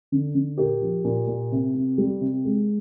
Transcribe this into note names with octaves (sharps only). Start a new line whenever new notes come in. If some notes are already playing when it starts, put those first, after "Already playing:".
D3
D3
A#2 G4 A#4
F3
A#2
A#2
C3
C3
G3
C3
G#3